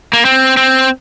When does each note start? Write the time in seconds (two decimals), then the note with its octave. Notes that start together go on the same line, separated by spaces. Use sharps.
0.13 A#3
0.25 C4
0.57 C4